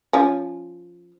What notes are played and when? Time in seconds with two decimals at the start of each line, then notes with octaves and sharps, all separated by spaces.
0.13 F3 C#4